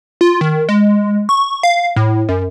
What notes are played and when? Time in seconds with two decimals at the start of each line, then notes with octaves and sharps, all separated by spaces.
0.21 F4
0.41 D#3
0.69 G#3
1.29 C#6
1.63 F5
1.96 A2
2.29 F#2